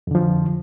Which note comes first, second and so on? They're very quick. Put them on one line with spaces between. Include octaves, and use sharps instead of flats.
F2 D3 F3